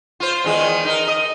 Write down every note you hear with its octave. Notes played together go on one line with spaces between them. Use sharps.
F4 C5
E2 D#3 G#3
D#4 A#4
D#5